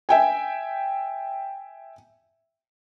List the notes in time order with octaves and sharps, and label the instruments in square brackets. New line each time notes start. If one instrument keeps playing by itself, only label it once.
[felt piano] E5 G5 G#5